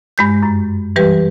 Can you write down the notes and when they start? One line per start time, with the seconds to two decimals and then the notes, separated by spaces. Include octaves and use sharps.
0.18 G2 G#3 G6
0.43 F#2
0.96 E3 G3 G4 B4